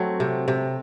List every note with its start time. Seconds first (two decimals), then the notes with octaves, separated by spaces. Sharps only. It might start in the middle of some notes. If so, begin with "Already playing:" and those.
Already playing: F#3 A3 C4
0.20 C3
0.48 C3